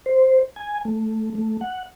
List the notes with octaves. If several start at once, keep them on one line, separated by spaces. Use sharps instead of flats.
C5
G#5
A3
A3
F#5